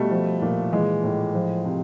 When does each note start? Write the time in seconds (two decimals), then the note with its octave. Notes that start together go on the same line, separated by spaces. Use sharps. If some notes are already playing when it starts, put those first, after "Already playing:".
Already playing: B2 G3 A3
0.11 F3
0.42 A#2
0.73 E3 G#3
1.04 A2
1.35 F3
1.65 C3